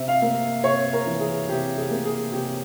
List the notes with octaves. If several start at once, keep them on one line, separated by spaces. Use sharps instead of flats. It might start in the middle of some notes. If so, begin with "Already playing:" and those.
Already playing: C3 E5
F5
A#3
C3 C#5
A#4
E3
G#4
C3 G4
G#4
A#3
G#4
C3 G4